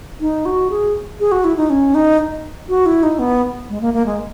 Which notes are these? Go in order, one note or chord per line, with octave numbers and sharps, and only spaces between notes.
D#4
F#4
G#4
G#4
F#4
E4
D#4
C#4
D#4
F#4
E4
D#4
B3
G#3
A#3
A#3
G#3